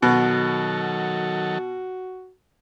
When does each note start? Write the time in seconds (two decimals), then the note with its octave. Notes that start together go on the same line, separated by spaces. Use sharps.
0.02 B2 D#3 F#3 F#4 A4